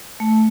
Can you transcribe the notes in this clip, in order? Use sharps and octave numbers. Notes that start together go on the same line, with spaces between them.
A3